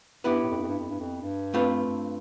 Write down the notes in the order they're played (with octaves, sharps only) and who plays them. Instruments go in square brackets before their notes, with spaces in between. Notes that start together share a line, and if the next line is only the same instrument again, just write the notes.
[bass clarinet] G2 [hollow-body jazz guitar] B3 E4 G4 B4
[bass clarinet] A2
F2
G2
F2
G2
F2
G2
F2
G2
[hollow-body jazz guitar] A3 C4 F4 B4
[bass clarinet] G2